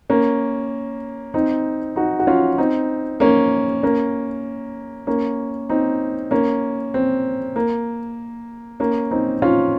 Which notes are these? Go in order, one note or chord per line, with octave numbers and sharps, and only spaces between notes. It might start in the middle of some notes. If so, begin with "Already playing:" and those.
A#3 C#4
C4 D#4
D#4 F#4
F#4
C#4 F4
C4 D#4
A#3 C#4
A#3 C#4
A#3 C#4
C4 D#4
A#3 C#4
C4
A#3
A#3 C#4
C4 D#4
C#4 F4